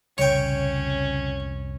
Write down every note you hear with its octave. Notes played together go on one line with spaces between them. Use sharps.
C2 F2 A#2 C#3 C#4 C#5 G5